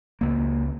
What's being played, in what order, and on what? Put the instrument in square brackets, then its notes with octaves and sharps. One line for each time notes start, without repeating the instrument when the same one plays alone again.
[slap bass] C#2 A#3